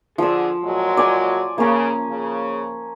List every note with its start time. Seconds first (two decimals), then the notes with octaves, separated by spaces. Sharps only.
0.18 D3 F3 G#4 E6
0.63 A#2 F#3 G#3
0.97 D5 G#5
1.58 C#3 A#3 C#4
2.10 C#3